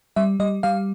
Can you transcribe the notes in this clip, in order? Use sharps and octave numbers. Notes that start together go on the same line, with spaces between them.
G3 E5
G3 D#5
G3 F5